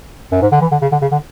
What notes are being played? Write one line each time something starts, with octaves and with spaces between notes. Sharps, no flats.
F#2
G#2
D3
E3
D3
C#3
D3
C#3
D3